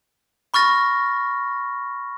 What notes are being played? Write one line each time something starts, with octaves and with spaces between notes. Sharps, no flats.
B5 C#6 F6 A6 A#6